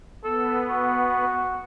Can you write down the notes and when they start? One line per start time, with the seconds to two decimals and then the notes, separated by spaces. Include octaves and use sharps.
0.24 B3 A4
0.70 F#4